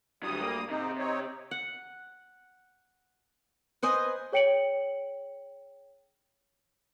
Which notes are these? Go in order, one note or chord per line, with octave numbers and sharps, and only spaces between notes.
D2 F#3 G3 D4 D#6
A#3
G#2 C3 D#4
C4 D#4 C#5
F#5
B4 C5 D#5 G#5
G#4 C#5 G5 C#7 D7 F#7